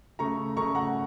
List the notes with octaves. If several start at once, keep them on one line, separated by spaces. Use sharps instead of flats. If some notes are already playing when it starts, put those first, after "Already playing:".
C#3 A3 A#5 C#6
C#3 A3 A#5 C#6
F#5 A#5